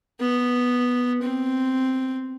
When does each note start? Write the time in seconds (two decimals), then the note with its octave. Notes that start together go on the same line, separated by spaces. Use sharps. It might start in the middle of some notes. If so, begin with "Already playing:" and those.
0.20 B3
1.22 C4